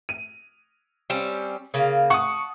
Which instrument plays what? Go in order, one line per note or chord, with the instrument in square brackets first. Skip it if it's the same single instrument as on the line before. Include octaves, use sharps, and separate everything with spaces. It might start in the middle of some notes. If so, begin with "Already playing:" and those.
[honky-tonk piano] D#7
[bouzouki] G3 C4 C#4
C#3 A#3
[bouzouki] F#5 A5 [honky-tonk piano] C#6 D#6